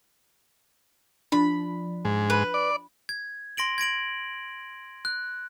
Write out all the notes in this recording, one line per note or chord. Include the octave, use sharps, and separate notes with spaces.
F3 D4 B5
G#2
B4
D5
G#6
C6 A#6 D7 F#7
G#6 A#6 D7 F#7
F#6